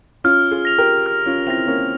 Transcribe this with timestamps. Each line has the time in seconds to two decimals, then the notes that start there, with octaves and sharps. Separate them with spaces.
0.24 C#4 F4 F6
0.51 F4 G#4
0.65 A#6 F7
0.78 G4 A#4
1.06 F6
1.26 C#4 F4
1.47 C4 E4 A#6 F7
1.67 A#3 C#4